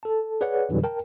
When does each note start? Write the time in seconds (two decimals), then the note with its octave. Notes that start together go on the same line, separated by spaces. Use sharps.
0.03 A4 A5
0.41 G#4 B4 C#5 D5 F#5
0.69 F2 B2 D3 E3 F#3 G3
0.84 A#4 G5 A5